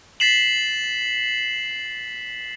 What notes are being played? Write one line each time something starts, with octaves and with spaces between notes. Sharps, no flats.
A6 B6 C7 E7 F#7